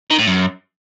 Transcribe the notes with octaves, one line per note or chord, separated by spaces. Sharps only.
D#3
A2
F#2